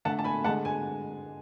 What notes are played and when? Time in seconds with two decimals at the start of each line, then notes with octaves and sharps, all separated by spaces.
0.05 D3 A3 F#5 A5
0.19 A5
0.24 G#5 B5
0.44 D3 G#3 F#5 A5
0.65 G#5